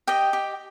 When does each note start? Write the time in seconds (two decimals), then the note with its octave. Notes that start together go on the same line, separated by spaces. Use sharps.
0.07 G4 D#5 G5
0.33 G4